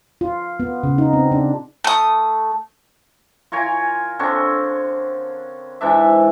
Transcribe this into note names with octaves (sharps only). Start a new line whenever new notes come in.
F4
B3
C#3
D#4
C4
D4
A3 D#6
F4 A#4 C#5 G#5
D3 C4 D4 C#5
G#2 E3 D4 E5